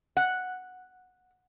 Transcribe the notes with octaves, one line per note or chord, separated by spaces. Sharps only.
F#5